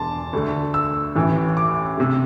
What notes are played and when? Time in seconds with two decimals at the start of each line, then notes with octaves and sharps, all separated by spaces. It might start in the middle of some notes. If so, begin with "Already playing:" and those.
Already playing: E1 E2 D3 A5 C6 D6
0.33 D2 D3 A3
0.74 E6
1.15 A1 A2 E3
1.57 D6
1.98 C3 A3